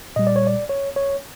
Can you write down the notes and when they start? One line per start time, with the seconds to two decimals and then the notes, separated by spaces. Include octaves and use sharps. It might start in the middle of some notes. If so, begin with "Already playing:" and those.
0.16 A#2 G3 D#5
0.27 D5
0.36 C#5
0.47 D5
0.69 C#5
0.96 C#5